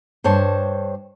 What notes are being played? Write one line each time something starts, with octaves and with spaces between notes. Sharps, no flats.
G2 C5 C#5 A5